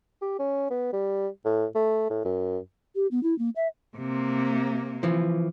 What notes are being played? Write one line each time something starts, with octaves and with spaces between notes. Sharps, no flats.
G4
C#4
B3
G3
A2
A3
A2
F#2
G4
B3
E4
A#3
E5
C3 A#3
E3 F3